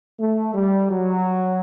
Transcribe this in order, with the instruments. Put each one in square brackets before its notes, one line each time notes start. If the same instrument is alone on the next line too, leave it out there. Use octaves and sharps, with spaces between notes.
[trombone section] A3
G3
F#3